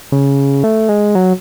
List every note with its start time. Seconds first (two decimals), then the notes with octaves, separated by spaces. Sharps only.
0.12 C#3
0.64 A3
0.89 G#3
1.15 F#3